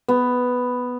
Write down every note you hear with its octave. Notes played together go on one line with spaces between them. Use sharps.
B3